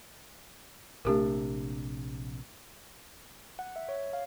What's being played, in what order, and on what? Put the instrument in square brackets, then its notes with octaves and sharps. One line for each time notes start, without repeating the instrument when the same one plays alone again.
[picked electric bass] A#1 C3 D4 [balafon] A3 G4 A#4
[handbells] F#5
E5
C#5
F5